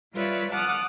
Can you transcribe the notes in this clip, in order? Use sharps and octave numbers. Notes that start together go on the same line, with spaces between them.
G3 F4 B4 C#5 D5 E5
F#5 A5 D6 D#6 F6 F#6